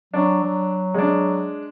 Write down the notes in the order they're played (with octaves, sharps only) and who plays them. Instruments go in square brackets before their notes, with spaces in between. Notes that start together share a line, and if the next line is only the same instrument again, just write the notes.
[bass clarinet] F#3 [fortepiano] D4
[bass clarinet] F#3
[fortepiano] G#3 D4